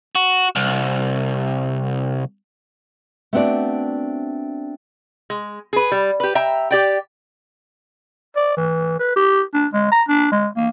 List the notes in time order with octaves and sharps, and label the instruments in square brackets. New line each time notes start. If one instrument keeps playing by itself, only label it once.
[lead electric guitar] F#4
C2
[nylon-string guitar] A3 B3 C4 D4 F#4 D5
[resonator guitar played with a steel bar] G#3
G#4 B4
G3
G4 B4
E5 G5 A#5
G4 D5 G5
[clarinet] D5
E3
B4
G4
D4
G#3
A#5
D4
G#3
A#3